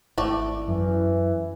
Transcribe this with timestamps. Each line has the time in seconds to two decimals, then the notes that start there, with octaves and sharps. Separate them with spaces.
0.18 G#1 A3 E4 D5
0.68 F#2 E3